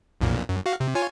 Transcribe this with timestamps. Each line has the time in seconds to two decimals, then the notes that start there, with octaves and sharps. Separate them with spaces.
0.21 B1 F2 A#2
0.49 F#2
0.66 F#4 F5
0.80 C3
0.95 F4 C#5 G#5